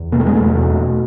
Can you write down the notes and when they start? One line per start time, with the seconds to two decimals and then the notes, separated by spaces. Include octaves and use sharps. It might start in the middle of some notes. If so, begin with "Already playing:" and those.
Already playing: E2
0.12 B2 A#3
0.20 A3
0.26 G#3
0.33 E2 A3
0.55 B2